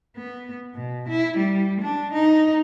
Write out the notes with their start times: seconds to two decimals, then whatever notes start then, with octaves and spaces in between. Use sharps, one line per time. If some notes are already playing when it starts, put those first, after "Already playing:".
0.16 B3
0.75 B2
1.09 E4
1.38 G3
1.81 D4
2.13 D#4